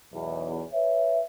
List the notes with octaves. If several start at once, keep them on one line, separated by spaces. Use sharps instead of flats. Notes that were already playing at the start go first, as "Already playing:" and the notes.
B1 E2
B4 C#5 E5